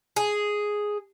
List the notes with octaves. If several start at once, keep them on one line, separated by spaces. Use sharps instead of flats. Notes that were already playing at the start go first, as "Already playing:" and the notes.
G#4